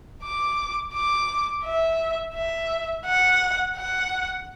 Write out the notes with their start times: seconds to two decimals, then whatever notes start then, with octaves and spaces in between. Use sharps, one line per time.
0.23 D6
0.94 D6
1.65 E5
2.35 E5
3.05 F#5
3.76 F#5